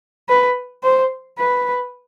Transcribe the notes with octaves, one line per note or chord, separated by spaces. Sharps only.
B4
C5
B4